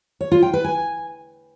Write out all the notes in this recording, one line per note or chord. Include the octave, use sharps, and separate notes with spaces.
C#5
F4
G5
B4
G#5